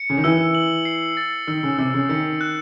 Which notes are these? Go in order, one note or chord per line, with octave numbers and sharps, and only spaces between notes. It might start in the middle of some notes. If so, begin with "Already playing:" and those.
Already playing: C#7
C#3
D#3
E3 E6
F#7
C7
A6
D#3 E6
C#3
C3 E6
C#3
D#3 C#7
F#6